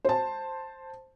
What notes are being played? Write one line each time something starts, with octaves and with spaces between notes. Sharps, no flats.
C5 A5